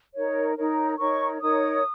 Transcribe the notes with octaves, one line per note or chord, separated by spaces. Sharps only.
D#4 A#4 C#5
D#4 A#4 C#5
D#4 A#4 C#5 C#6
D#4 A#4 C#5 D#6